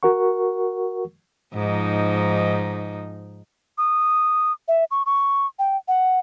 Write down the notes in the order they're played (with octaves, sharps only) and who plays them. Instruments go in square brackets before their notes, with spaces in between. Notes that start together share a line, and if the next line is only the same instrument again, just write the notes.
[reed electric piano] F#4 A#4 F#5 C#6
[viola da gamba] G#2 F3 D#4
[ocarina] D#6
E5
C#6
C#6
G5
F#5